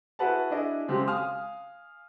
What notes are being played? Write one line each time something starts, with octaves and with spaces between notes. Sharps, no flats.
E4 F#4 G#4 B4 F#5 A5
D4 E4 G#4 D#5
C#3 F#3 G#3 C4 G4
F5 G#5 D#6 F6